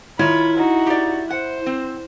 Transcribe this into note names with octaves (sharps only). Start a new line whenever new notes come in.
D#3 E4 F4 C#5 B5
D#4 F#4
G4 D5
C5 F#5
C4